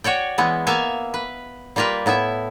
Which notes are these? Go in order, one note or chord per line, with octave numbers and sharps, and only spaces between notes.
F#4 C#5 D5 G5
E3 G#3 B3
A#3 B3 E5 F5 G#5
B4
G3 A#3 F4 A#4 B4
A2 B3 E4 E5